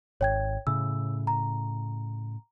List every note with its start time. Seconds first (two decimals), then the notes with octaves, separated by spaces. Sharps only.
0.21 G#1 C#5 G5 G#6
0.67 A2 C#3 E6
1.27 A#5